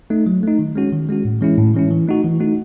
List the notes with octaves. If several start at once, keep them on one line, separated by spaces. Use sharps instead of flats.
A3 D#4
F#3
A3 D#4
D#3
G#3 C#4 F#4
D#3
G#3 C#4 F#4
A2
E3 G#3 C#4 E4
A2
E3 G#3 C#4 E4
E3
A3 D#4 F#4
E3
A3 D#4 F#4